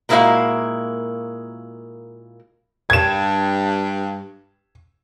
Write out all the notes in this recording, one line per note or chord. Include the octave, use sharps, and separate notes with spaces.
A#2 G#3 A#3 E4 F#4 F5
G2 G#6 E7